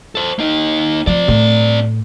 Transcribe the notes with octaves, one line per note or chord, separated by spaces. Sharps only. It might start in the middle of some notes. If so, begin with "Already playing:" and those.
A4 C5
A#3 D#4
F3 C4 D5
A2